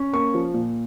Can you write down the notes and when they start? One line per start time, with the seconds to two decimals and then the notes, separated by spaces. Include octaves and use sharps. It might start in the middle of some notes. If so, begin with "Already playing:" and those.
Already playing: C#4
0.13 A#3 C#6
0.34 F3
0.54 A#2